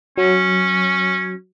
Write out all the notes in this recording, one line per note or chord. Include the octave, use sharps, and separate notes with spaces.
F#3 C#4